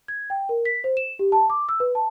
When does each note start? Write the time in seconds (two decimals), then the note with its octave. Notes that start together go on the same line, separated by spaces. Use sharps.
0.08 G#6
0.30 G5
0.49 A#4
0.65 B6
0.84 C5
0.97 E7
1.19 G4
1.32 A5
1.50 D6
1.69 E6
1.80 B4
1.95 A5